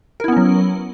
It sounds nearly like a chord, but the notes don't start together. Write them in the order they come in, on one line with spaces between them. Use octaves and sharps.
A#4 E4 B3 C#4 F#3